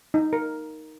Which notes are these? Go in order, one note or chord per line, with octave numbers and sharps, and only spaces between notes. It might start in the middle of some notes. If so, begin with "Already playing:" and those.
D#4
A#4